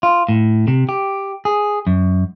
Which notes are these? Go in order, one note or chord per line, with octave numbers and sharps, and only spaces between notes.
F4
A2
C3
G4
G#4
F#2